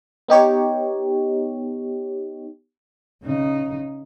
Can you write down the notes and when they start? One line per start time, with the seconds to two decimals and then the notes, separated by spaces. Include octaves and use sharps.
0.28 B3 D#4 G4 C#5
3.22 C#3 D#4